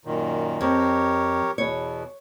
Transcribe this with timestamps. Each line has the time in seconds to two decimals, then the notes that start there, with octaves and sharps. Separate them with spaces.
0.05 F#2 A#2 D#3
0.61 F2 G4 A#4 C#5
1.58 E2 B2 C#5